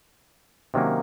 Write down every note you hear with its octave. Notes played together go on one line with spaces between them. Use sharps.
C3 D#3 F#3 A#3 C#4